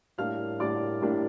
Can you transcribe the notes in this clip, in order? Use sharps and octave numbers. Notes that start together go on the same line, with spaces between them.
A2 G3 A#3 D4 F5 F6
A2 G3 A#3 D4 D5 D6
A2 G3 A#3 D4